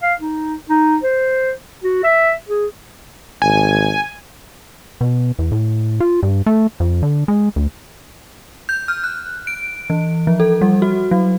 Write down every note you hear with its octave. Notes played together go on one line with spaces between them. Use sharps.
F5
D#4
D#4
C5
F#4
E5
G#4
G#1 G#5
B2
E2
A2
F4
G2
A3
F2
D3
G#3
D2
G6
F6
F#6
D7
E3
F3
A4
G3
F#4
F#3